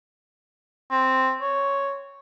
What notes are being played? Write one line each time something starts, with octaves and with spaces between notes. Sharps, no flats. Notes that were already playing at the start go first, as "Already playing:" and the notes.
C4
C#5